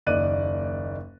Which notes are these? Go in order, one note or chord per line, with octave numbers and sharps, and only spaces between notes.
F#1 D#2 D5 D#5 F#6 D#7